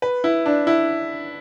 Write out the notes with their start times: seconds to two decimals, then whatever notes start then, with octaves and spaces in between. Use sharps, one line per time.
0.02 B4
0.24 E4
0.46 D4
0.67 E4